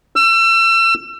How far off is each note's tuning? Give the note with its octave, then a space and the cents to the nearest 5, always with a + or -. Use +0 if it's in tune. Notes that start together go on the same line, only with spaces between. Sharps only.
E6 +35